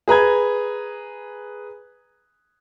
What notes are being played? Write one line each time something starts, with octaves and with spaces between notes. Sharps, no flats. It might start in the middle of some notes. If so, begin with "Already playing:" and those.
G#4 B4 A#5 G#6